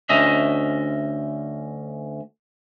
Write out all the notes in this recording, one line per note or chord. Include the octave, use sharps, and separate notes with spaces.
D2 C#4 D#5 E5